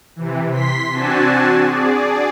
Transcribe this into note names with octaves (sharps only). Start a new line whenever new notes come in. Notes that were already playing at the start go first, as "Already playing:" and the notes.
C3 E3
C6 B6
C4 D4 F#4 G#5 A5
G#4 D5